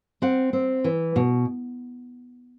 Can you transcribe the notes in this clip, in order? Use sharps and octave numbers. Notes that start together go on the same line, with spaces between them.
C4 F#5
C4
E3
B2